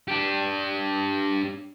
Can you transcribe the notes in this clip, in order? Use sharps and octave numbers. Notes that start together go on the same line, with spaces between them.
D4 G4